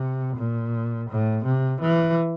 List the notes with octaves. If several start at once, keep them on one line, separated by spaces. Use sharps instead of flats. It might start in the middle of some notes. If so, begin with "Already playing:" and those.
Already playing: C3
A#2
A2
C3
E3